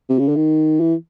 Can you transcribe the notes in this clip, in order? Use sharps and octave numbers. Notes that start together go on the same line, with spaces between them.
C3
C#3
D3
D#3
E3